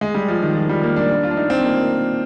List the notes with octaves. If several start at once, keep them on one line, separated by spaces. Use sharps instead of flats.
G#3
G3
F3
D#3
F3
G3
A#3
D4
D4
F4
D4
D#4
C4
A#3